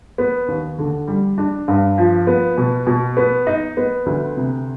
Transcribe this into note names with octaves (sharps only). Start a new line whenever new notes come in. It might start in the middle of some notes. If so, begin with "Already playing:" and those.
B3
D#2
D3
G3
D4
G2
F3
B3
B2
B2
B3
D#4
B3
D2
C3